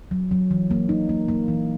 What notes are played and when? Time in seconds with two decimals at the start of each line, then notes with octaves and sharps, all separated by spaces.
0.11 F#3
0.31 F#3
0.51 E3
0.71 A#3
0.89 D#4
1.09 A#3
1.28 A#3
1.48 E3